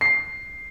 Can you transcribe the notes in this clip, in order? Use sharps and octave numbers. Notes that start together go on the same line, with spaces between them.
C7